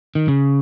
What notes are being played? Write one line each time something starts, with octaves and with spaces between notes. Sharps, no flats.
D#3
C#3